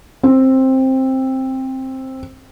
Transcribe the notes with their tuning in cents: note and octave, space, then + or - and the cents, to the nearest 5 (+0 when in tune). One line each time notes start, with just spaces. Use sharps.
C4 +10